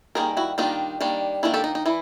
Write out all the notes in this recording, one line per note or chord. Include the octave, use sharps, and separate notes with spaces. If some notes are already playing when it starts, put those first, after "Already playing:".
D#3 G3 A#3 G#4 A#4
E4 F#4
D#3 G3 A#3 D4 D#4 F4
D#3 G3 A#3 D4
D#3 G3 A#3 D4 E4
G4 A4
D#4
D#4
E3 E4